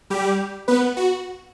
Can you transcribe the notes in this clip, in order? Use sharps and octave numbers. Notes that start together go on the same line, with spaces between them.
G3 G4
B3 B4
F#4